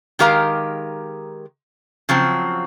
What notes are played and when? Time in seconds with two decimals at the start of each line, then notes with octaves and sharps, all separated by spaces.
0.19 D#3 G#3 G4 A#4 F5 A#5
2.09 C#3 F3 F#3 C4